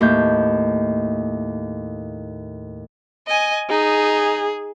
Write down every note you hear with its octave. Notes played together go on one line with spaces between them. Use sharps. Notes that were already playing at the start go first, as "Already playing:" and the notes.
D#2 A2 G6
D#5 G#5
D#4 G#4